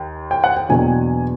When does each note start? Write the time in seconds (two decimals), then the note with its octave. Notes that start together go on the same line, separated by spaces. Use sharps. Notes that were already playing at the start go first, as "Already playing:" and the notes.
Already playing: D#2
0.31 G5
0.44 F#5
0.57 G5
0.69 E2 B2 F#3 A#3 D4 G#5